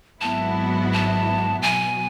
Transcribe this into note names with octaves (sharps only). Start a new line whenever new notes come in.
G#1 G#2 F#3 B3 E4 A5
A5
B2 F#3 B3 G#5